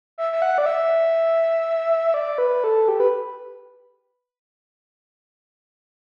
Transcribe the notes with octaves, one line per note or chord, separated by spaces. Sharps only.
E5
E5
F#5
D5
E5
D5
B4
A4
G4
B4